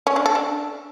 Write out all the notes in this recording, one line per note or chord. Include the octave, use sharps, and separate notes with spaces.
C#4
D4
A4
D4